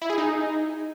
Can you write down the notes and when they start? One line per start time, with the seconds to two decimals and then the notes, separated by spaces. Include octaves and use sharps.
0.02 E4
0.10 G#4
0.18 D#4